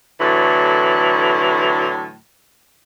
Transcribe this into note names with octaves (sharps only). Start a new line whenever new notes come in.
A2 D3 E3 F#3